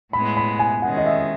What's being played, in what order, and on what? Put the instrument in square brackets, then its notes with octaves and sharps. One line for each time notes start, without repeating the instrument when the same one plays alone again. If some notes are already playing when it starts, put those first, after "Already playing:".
[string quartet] A2 G#3 B3 [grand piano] B5
[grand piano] B5
G#5
[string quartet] D#3 G#3 C#4 [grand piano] F#5
[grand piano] D#5
E5